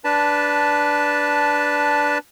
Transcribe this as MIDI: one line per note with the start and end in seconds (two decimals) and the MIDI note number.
0.04 2.18 62
0.04 2.18 71
0.04 2.18 81